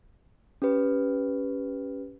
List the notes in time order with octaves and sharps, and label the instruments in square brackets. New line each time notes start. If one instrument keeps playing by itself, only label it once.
[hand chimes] C#4 G4 B4